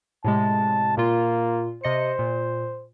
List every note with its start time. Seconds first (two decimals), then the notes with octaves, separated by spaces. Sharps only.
0.24 A2 C3 G#3 A5
0.97 A#2 A#3 F4
1.84 C3 C5 D#5 C#7
2.19 A#2